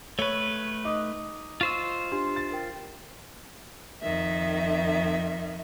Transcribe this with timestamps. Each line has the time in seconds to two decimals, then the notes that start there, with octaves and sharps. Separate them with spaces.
0.19 A3 B4 C#5
0.85 D#4 D6 D#6
1.61 F4 C5 C#6 E6 D#7
2.12 D4 G4 C6
2.36 A6
2.52 A#4 G5
4.01 F2 D#3 E5